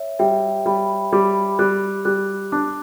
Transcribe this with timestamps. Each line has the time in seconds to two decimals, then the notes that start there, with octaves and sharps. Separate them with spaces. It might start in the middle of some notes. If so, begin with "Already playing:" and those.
Already playing: C#5 E5
0.19 G3 E5 G5
0.66 G3 G5 B5
1.13 G3 B5 D6
1.59 G3 D6 F#6
2.05 G3 D6 F#6
2.52 D4 D6 F#6